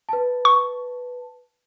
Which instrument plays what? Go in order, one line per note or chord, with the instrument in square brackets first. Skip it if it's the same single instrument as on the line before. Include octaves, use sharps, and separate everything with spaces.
[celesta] B4 A5
[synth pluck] C#6